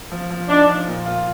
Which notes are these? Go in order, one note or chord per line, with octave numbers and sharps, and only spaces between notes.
F3
F3
D4 D#4
F3
A#2
F4